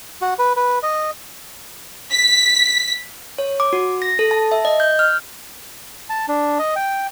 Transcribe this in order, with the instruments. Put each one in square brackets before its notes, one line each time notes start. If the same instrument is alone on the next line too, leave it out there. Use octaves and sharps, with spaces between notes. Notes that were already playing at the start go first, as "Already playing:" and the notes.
[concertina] F#4
B4
B4
D#5
[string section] B6
[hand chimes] C#5
D6
F#4
A#6
A4
A5
E5
D#5
G6
F6
[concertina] A5
D4
D#5
G5